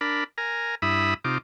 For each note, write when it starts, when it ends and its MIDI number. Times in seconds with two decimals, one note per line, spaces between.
0.01 0.24 62
0.01 0.24 70
0.01 0.24 83
0.38 0.75 70
0.38 0.75 80
0.38 0.75 82
0.82 1.14 43
0.82 1.14 64
0.82 1.14 76
0.82 1.14 83
0.82 1.14 87
1.24 1.38 48
1.24 1.38 63
1.24 1.38 65
1.24 1.38 86